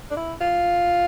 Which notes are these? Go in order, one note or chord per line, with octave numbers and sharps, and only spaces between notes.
D4
E4
F4